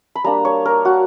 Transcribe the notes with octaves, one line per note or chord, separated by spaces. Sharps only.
B5
G3 A#3 D4 A#5
C#5
A#4
F#4